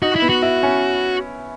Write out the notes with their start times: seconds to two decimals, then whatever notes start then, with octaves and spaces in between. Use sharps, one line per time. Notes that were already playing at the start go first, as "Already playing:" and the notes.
0.02 D#4 F#4
0.16 E4
0.22 B3
0.29 F#4
0.42 E4
0.63 C#4